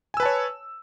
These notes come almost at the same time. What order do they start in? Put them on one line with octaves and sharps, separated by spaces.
G#5 E6 B4 A5 C#5